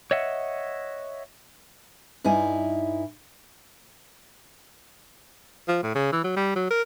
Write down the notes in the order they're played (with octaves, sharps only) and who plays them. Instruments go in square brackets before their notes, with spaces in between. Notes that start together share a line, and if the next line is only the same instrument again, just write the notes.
[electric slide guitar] C#5 D#5 E5 F#5
[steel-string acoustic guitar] G2 D#4 E4 G#5
[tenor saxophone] F3
A2
C#3
E3
F#3
G3
F#3
A#4